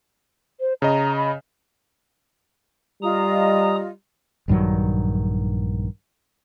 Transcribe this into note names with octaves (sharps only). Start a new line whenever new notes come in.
C5
C#3 D#5 A#5
B5
G3 F4 D#5 A#5 D#6
A#1 G2 D#3 F#3